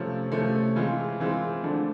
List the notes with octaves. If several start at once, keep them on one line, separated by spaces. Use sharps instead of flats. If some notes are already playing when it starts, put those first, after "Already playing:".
Already playing: C3 F3 A3 C#4
C3 F3 A3 C#4
E3 G#3 C4 F4
E3 G#3 C4 F4
D3 F3 A3 D4